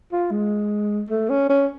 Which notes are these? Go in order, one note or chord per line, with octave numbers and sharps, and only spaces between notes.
F4
G#3
A3
C#4
C#4